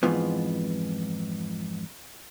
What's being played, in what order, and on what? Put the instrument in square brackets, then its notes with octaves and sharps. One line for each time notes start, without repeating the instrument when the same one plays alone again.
[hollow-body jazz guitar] F2 G#2 E3 F3 B3